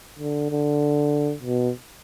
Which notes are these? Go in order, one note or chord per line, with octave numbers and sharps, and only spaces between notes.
D3
D3
B2